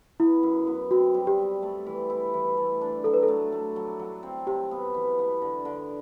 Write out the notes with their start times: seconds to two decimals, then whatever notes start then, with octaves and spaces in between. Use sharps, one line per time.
0.20 B3 E4
0.43 F#2
0.67 B3
0.91 C4 F#4
1.14 G3
1.27 G4
1.39 G3
1.62 A3
1.86 E3
2.10 E4
2.34 E3
2.57 A3
2.81 D4
3.04 F#3 A4
3.14 B4
3.23 A4
3.28 A3
3.52 A3
3.76 F#3
3.99 F#3
4.23 C4
4.47 C3 G4
4.71 B3
4.94 E3
5.19 B3
5.42 D3
5.65 D3